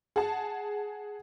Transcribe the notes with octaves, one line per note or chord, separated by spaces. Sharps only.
G#4 F#5 A5